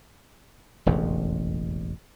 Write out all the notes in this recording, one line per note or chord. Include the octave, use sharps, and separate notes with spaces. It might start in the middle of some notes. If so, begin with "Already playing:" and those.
E1 A1 F2 C#3